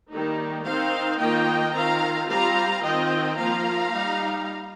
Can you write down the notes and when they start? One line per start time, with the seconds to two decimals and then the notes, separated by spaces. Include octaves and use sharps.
0.10 D#3 G3 A#3 D#4
0.65 D#3 C4 D#4 C5 F5
1.19 D#3 A#3 F4 D#5 G5
1.73 D#3 C4 F4 F5 A#5
2.28 G3 C4 F4 F5 A#5
2.83 D#3 C4 F4 D#5 G5
3.37 F3 A#3 F4 F5 A#5
3.92 G3 D#4